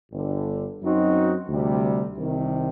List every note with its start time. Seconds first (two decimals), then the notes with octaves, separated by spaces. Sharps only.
0.12 G1 G2 D3
0.81 F#2 F#3 C4 D#4 F#4
1.49 D2 C3 G3
2.17 C2 C3 D#3